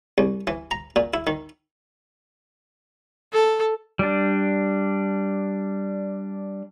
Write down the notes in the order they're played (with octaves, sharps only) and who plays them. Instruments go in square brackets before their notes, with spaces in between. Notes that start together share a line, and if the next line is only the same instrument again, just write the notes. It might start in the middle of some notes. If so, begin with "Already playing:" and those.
[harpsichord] C2
E3
A#5
A#2
E4
D#3
[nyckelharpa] A4
[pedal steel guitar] G3 D4